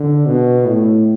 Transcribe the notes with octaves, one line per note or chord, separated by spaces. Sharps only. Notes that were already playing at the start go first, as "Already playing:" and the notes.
Already playing: D3
B2
A2